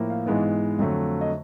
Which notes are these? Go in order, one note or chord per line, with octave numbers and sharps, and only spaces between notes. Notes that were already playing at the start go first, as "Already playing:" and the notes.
Already playing: A2 F3 A#3
F5
G#2 E3 G#3 B3
F2 D3 F#3 A3
D#5